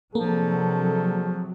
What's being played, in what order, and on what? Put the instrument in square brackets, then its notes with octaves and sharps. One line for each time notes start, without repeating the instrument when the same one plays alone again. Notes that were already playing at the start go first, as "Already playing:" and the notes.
[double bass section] C3 F#3 [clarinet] F3 [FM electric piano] A#3 [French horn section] D4 G#4 A4